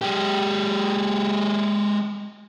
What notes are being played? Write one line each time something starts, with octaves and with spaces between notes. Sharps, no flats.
G#3 G4